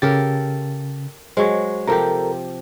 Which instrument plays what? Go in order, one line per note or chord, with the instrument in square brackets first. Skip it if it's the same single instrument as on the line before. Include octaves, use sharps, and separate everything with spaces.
[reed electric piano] C#3 A6 [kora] G4 A4 A#4
[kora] F#3 G#3 [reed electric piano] C5 C#6
[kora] C3 F3 G4 [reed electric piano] A4 A#4 A#5